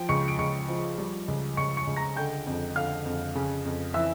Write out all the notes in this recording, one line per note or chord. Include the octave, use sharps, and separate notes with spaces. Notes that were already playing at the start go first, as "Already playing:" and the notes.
Already playing: F3 G5
C#2 C#6 C#7
D7
C#2 C#6 C#7
F3
G3
C#2
C#2 C#6 C#7
C#6 C#7
C#2
A#5 A#6
D3 G5 G6
F2
D3 F5 F6
F2
C#3
F2
E3 E5 E6